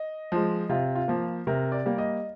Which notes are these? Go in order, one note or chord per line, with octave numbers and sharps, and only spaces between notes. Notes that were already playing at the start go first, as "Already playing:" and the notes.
Already playing: D#5
F3 G#3
C3 F4
F4
F3 A#3
C3 A#4
D5
G3 A#3
D#5